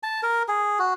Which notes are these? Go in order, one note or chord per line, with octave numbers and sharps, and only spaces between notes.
A5
A#4
G#4
F#4